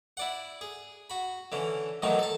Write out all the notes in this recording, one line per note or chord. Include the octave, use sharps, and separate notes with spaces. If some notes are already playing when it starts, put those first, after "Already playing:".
E4 D5 F#5
G#4
F#4 B5
D3 E3 C#4
F#2 A2 D#3 E3 F#3 D#4
A4 A5